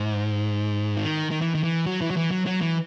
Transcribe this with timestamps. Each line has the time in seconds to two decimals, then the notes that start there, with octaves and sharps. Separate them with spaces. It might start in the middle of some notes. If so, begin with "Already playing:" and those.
Already playing: G#2
0.97 D#3
1.31 D#3
1.41 E3
1.55 D#3
1.64 E3
1.86 F#3
2.01 E3
2.11 F#3
2.17 E3
2.31 F#3
2.46 F#3
2.61 E3